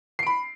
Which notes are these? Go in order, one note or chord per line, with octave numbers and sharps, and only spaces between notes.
B5 C7 D7